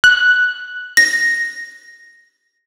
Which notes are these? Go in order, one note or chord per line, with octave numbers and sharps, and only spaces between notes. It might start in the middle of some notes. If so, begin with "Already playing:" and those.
F#6
A#6